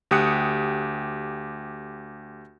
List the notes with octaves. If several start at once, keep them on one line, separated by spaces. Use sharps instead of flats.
D2 G4 D#6 F#6 C#7